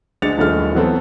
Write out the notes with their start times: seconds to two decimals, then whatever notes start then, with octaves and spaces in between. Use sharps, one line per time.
0.22 D2 G#3 D4 A6 C#7 F7
0.38 D#1 A#1 G#3 A3 F6
0.75 E3 F#3 B3 C4 F#4 A4